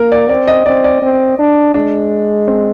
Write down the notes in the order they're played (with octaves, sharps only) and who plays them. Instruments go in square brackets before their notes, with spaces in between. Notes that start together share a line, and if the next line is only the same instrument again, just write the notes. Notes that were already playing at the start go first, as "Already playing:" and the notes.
Already playing: [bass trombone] A#3 [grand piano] A#4
[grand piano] D5
[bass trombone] C4 [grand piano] D5
[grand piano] D#5
[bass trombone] C4 [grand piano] D5
[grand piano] D5
[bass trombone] C4
D4
[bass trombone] G#3 [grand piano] D4
[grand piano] C4